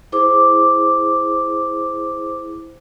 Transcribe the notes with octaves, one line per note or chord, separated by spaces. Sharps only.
E4 G#4 C5 D6